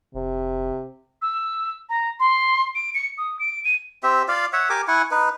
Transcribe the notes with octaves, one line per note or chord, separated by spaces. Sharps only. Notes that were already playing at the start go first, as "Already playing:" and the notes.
F1 C3
E6
A#5
C6
D7
C#7
D#6
D7
D#7
C4 G4 E5
F4 D5 F5
C#5 E5 F#5
G4 A#4 G#5 D6
E4 F#5 G#5 C#6
D#4 B4